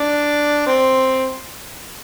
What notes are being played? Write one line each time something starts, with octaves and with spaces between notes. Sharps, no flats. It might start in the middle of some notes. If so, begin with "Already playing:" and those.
Already playing: D4
C4